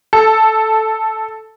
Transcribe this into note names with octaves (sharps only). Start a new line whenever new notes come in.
A4